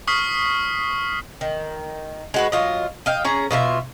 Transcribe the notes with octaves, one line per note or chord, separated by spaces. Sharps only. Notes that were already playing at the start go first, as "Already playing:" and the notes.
C#6 D#6 F6 B6 C7
D#3
G#3 F#4 B4
F#3 F4 D#5
D#5 F5 G5
C#4 G#4 A#5
B2 F4 A#4 E5